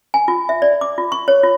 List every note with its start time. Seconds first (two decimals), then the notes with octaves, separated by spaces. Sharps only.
0.14 G#5
0.28 F4
0.49 E5
0.62 D5
0.81 D6
0.98 F4
1.12 C#6
1.28 C#5
1.43 F4